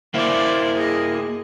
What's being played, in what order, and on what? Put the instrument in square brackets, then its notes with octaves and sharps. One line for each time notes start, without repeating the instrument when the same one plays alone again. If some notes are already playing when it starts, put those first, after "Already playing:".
[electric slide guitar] A#3 E4 [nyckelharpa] C5 D5
[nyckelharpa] G#4 D#5